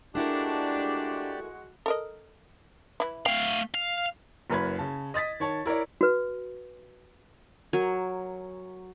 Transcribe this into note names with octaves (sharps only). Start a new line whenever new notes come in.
G#3 A3 D4 E4 F#4 G4 A#4 D5
A4 A#4 D#5
E3 E4
A3 F5 G5
F5
F#1 F#2 B4 B5 G#6
C#3 A5
D#5 D#6 A6 B6
D#3 C#5 A5
E4 A#4 C#5 D5
F#4 B4
F#3 A#4 G#5